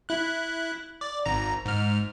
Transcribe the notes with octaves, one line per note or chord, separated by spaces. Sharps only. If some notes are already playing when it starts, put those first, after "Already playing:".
E4 F#6
D5
G#1 A#5
G#2 F6